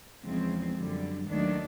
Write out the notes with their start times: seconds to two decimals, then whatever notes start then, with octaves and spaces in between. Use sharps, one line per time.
0.25 E2 C#3 F3 G#3 C4
0.77 F#2 D3 G3
1.29 D#2 D#3 F#3 A3 D4